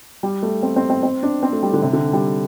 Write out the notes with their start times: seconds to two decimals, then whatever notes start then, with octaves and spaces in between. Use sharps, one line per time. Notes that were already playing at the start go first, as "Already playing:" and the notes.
0.23 G3
0.43 A3
0.63 C4
0.76 C4
0.90 C4
1.03 C4
1.23 D4
1.43 C4
1.53 A3
1.63 G3
1.73 D3
1.82 C3
1.93 D3
2.13 G3